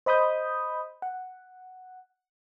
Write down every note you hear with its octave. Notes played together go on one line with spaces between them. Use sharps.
C5 D#5 B5 D#6 G6
F#5